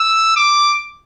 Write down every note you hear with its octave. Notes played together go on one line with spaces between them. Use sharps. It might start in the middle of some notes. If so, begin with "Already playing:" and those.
Already playing: E6
D6